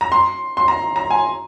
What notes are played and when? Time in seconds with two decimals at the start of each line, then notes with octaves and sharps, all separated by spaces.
0.01 A#5
0.12 C6
0.57 C6
0.68 A#5
0.96 A#5
1.10 G#5